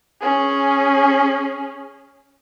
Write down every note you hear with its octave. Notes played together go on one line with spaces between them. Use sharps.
C#4 G#4